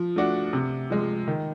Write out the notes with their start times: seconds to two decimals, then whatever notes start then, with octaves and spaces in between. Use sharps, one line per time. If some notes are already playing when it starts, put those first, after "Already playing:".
Already playing: F3
0.16 A3 D4 F#4
0.53 C3
0.90 F3 G#3
1.28 D#3